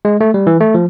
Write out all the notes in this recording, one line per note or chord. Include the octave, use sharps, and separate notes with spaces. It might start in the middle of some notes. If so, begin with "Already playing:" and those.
G#3
A3
G3
E3
A3
F3